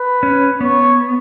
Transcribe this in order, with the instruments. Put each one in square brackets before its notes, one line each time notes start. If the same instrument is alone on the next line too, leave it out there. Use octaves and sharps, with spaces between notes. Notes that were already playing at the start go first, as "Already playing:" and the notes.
Already playing: [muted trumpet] B4
[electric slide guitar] C#4
[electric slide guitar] B3 [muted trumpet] C#5